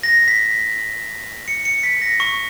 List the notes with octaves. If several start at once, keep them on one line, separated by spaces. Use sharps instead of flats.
A#6
B6
C#7
C#7
B6
A#6
C#6